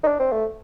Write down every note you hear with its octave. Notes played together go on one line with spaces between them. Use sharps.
D#4
D4
C4
A3